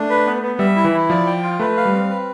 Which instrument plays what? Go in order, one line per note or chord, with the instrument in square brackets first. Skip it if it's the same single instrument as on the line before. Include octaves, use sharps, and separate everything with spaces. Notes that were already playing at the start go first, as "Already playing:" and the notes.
Already playing: [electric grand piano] A3 [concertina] D4
[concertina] B4
B3
B3
[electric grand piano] G3 [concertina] E5
[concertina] E4
[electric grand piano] E3
[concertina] E4
[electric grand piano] F3 [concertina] D5
[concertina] G5
F4
[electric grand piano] A3 [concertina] B4
[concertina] F5
[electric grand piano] G3
[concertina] C4
B4